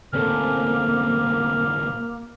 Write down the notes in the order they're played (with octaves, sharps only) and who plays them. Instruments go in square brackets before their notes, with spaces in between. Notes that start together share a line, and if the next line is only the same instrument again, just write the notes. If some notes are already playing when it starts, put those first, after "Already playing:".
[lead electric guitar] D2 A#2 [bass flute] A#3 [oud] C4 C#4 A4 [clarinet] F6